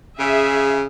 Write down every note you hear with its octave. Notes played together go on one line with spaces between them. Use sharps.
C#3 G#4 E5